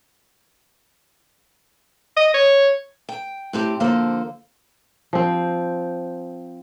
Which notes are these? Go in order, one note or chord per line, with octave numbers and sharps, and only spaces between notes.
D#5
C#5
G5
A2 C4 G4
D3 F3 A#3 A4 C5
F3 C4